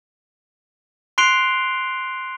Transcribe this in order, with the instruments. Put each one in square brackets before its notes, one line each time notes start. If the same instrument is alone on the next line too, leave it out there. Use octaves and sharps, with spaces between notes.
[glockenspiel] C6 F#6 C7 D7 F7 G7